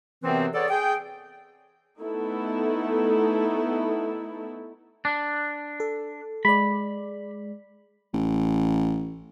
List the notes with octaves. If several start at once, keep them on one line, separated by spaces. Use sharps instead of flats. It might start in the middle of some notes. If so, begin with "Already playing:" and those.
F#2 C3 E3 B3 C4
B3 G#4 A4 C#5 D5
G#4 G5
A3 B3 D#4 E4 A4
D4
A4
G#3 D5 B5
A1